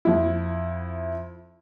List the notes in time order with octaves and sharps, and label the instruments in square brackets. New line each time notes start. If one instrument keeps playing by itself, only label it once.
[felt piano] F2 E4